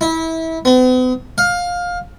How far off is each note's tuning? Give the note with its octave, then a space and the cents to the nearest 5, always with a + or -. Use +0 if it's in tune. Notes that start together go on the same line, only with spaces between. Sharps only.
E4 -25
B3 +45
F5 +20